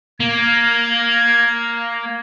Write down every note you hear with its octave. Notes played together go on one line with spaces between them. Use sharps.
A#3 G#6